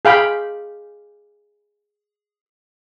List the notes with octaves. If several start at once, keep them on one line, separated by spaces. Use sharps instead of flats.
G#4 F5 G5 B5